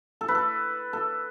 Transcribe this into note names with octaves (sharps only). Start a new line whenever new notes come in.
A4
B4
A4
A4